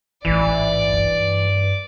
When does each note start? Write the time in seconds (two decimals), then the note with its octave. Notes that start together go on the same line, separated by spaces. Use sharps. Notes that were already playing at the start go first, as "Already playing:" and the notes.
0.25 A1 G#2 E3 D5
0.93 G2